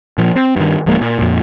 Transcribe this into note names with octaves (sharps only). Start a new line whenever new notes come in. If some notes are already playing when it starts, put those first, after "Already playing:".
A#2 F3
C4
G2 D#3
D1 F3 G#3 A#3
A#2
F2 A#2